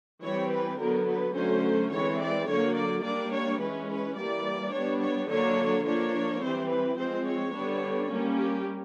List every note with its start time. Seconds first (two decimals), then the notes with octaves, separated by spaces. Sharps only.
0.23 E3 G3 C4 C#5
0.51 B4
0.80 D3 F#3 B3 A#4
1.08 B4
1.36 D3 F#3 A3 C#4 C5
1.92 E3 G#3 C4 C#5
2.20 D5
2.48 D3 F#3 A#3 C#5
2.76 D5
3.04 G3 A#3 D4 D5
3.32 C#5
3.61 E3 G#3 C#4 B4
3.89 B4
4.17 E3 G3 A#3 D5
4.73 G3 B3 D4 C#5
5.02 C#5
5.30 D3 F#3 A#3 D4 C#5
5.86 F3 A#3 D4 C#5
6.42 E3 G3 C4 C5
6.70 B4
6.98 F3 G#3 C4 C5
7.27 C#5
7.55 D3 G3 B3 D4
8.11 G3 A#3 C#4
8.39 G4